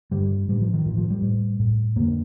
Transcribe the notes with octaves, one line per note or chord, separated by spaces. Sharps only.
G2 D3 G3
A2 G3
F3
D#3
A2 F3
F3
G3
A2
A2
F2 D3 A#3